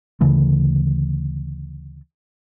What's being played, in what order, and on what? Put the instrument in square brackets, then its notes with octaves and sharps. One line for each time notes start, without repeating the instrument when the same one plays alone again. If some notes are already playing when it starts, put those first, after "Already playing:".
[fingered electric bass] D2 C#3 E3 A3